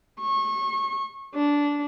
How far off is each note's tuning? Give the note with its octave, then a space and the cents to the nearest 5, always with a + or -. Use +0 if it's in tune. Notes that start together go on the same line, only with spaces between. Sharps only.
C#6 -30
D4 -15